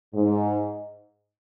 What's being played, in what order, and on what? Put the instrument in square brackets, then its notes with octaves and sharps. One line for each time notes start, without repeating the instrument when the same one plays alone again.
[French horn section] G#2